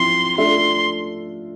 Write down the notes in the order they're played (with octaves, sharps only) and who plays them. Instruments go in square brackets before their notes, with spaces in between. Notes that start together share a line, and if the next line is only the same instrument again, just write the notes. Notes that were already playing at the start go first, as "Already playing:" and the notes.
Already playing: [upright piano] F3 C4 E4 [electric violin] C6
[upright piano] A3 D4 F4 A4 E5 [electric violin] C6